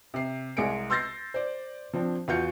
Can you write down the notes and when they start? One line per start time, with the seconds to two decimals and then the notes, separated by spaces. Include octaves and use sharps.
0.14 C3 C7
0.57 C2 G#3 G#4 C#7 D7
0.90 C6 E6 G6 A6 A#6 C7
1.34 C5 D5
1.94 F3 C4 D4
2.28 E2 F4 F#4 G6 C#7